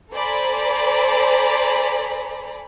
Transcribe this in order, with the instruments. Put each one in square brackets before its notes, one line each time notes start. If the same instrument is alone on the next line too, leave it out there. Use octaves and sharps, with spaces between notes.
[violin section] A4 C5 D5 G#5 A#5 B5